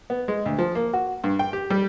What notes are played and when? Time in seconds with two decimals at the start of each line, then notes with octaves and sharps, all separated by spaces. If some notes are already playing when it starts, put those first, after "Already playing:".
0.10 B3
0.28 G#3
0.46 D2
0.59 F3
0.75 A#3
0.93 F#4
1.24 G2
1.39 G5
1.53 G4
1.70 G3